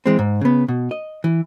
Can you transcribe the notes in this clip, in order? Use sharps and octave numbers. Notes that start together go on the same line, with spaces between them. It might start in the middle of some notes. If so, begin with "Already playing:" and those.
E3 G#3 C4
G#2
C#3 B3
B2
D#5
E3